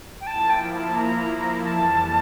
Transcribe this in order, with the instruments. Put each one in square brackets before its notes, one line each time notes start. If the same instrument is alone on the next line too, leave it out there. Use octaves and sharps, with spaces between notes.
[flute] G5
[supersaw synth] F3 A#3 E4 [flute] A5
[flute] G5
A5
A#5
[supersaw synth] F2 E3 G3 [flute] A5